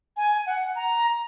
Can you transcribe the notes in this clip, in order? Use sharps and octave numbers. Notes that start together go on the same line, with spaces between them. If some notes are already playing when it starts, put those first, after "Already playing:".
G#5
F#5
A#5